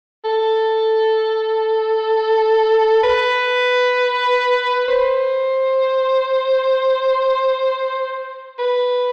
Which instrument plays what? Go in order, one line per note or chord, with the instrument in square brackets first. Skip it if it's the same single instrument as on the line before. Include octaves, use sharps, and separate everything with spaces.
[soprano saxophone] A4
B4
C5
B4